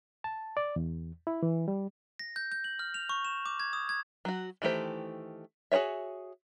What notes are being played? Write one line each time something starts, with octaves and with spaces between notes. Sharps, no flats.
A5
D5
E2
E4
E3
G3
A#6
G6
G6
F#7
F6
F7
C#6
E7
D6
G#6
D#6
G#6
F#3 F#4
D#3 E3 A3 G4 C5
F#4 G#4 B4 C#5 E5